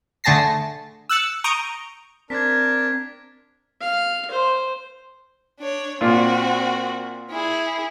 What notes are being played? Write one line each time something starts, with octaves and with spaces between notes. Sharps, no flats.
D3 A3 G#4 A5 A#6 C7
E6 F#6 A6 C#7
A#5 C#6 D#6 G6 C#7 D7
C4 D4 A#4 A5 G#6 B6
F5
C5
D4 C#5
A#2 C4 D4 F4 F#4
E4 G#4